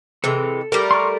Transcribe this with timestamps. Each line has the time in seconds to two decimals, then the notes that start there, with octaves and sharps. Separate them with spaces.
0.24 C3 E3 G#3 A4
0.72 G3 A3 A#4
0.91 C6 C#6 F6